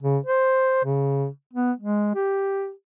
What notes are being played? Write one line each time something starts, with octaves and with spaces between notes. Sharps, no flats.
C#3
C5
C#3
B3
G#3
G4